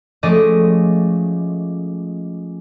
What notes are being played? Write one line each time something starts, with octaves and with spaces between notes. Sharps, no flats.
F3 G#3 A3 C#4 D#5 D6